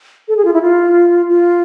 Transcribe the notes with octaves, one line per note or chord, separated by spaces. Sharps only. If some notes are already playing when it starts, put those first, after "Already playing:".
A4
G#4
F4
E4
F4
F4